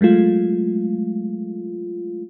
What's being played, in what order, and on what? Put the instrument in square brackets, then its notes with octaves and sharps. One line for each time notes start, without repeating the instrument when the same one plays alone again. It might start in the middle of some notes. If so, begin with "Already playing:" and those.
[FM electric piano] F#3 G#3 A3 F4